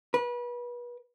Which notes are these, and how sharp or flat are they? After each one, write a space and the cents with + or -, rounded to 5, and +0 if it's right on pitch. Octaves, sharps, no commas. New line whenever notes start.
B4 -30